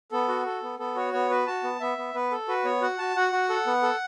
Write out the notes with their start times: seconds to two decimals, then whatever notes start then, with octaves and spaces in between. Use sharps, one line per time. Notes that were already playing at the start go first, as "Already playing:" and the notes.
0.12 B3 A4
0.28 F#4
0.46 A4
0.63 B3
0.79 B3 A4
0.96 F#4 C#5
1.13 B3 C#5
1.30 F#4 B4
1.47 F#4 A5
1.64 B3
1.80 B3 E5
1.98 B3
2.14 B3 B4
2.31 A4
2.48 F#4 B4
2.65 B3 C#5
2.81 F#4 F#5
2.99 F#4 A5
3.16 F#4 F#5
3.32 F#4
3.50 A4
3.67 B3
3.82 A4